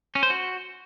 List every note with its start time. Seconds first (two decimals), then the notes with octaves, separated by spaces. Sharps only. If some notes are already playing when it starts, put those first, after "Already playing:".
0.15 C#4
0.23 C5
0.30 F#4